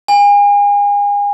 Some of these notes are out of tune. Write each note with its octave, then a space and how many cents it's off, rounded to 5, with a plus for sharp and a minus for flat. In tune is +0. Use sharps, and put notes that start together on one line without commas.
G#5 -35